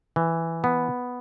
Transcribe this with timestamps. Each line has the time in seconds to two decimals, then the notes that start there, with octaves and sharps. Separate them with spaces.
0.16 E3
0.64 B3